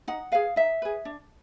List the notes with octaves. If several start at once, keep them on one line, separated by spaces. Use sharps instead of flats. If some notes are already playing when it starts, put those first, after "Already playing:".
D#4 F#5
G#4 B4 F5
D#4 E5
G#4 B4
D4